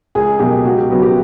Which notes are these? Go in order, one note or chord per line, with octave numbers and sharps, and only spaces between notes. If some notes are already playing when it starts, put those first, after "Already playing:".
C#2 G#4
B2 F#3 A#3 G4
C#2 F#4
G4
C#3 F#3 B3
G4